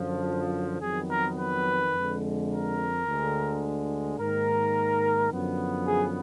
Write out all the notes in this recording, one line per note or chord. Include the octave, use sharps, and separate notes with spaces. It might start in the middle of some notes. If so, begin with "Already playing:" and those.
Already playing: F#2 D3 F3
F2 D#3 F#3 B3 G#4
A#4
B4
F2 D3 G#3
A#4
D2 D3 G#3
G#2 D#3 A#3 A#4
F#2 D3 F3 B3
G#4